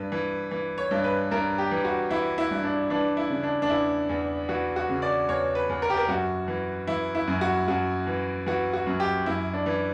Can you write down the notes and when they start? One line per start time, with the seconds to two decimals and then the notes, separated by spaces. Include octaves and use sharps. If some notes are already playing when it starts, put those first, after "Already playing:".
Already playing: G2 B4
0.12 E3
0.51 E3
0.78 C#5
0.91 G2
1.04 B4
1.31 G2 A#4
1.58 G4
1.71 E3
1.85 F#4
2.10 E3 E4
2.38 E4
2.51 G2
2.63 D4
2.90 E3 D4
3.17 E4
3.30 C#3
3.43 D4
3.62 D4
3.69 E2 E4
4.09 E2
4.49 E3 F#4
4.76 F#4
4.89 C#3
5.02 D5
5.28 E2 C#5
5.55 B4
5.69 E2
5.82 A#4
5.90 G4
5.97 A#4
6.08 F#2 F#4
6.48 E3
6.87 E3 E4
7.15 E4
7.27 F#2
7.41 F#4
7.68 F#2 F#4
8.07 E3
8.46 E3 F#4
8.73 F#4
8.86 F#2
9.00 G4
9.26 F#2 E4
9.53 D4
9.66 E3